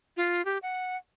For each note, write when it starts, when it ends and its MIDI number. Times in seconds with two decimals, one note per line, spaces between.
0.17 0.44 65
0.45 0.58 67
0.63 0.97 78